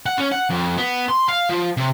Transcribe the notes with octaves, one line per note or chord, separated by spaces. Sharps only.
F#5
C#4
F#5
F2
B3
C6
F5
F3
C3